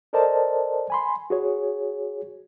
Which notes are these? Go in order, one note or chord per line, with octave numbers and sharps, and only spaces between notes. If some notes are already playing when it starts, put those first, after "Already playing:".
A4 A#4 C5 D5 D#5 A5
G#5 B5 C6
F#4 G#4 C#5